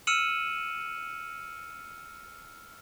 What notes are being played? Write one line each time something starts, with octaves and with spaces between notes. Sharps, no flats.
E6 F6 C#7 D#7 E7 F#7